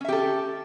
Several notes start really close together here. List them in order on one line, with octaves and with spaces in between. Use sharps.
C#4 E5 G4 A4